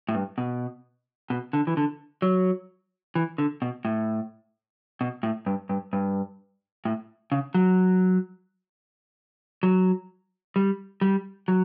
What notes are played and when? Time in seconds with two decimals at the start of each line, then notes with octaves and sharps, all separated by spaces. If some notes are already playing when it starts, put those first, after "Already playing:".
0.09 A2
0.15 G2
0.38 B2
1.30 B2
1.53 D3
1.67 E3
1.77 D3
2.22 F#3
3.15 E3
3.38 D3
3.62 B2
3.85 A2
5.01 B2
5.23 A2
5.46 G2
5.69 G2
5.93 G2
6.85 A2
7.32 C#3
7.54 F#3
9.63 F#3
10.56 G3
11.01 G3
11.48 F#3